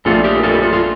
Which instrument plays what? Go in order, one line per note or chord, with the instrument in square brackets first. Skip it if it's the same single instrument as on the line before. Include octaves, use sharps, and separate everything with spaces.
[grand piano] A#1 A#2 A3 D4 [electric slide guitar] F4 A4
[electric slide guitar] G4 A#4
F4 A4
F4 A4
F4